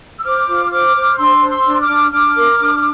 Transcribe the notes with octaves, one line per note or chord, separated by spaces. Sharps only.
E6
C5 D6 F6
F4
C5 D6 F6
C5
D4 C6 E6
C5
C6 E6
D4
D6 F6
D4
D4 D6 F6
A#4
D4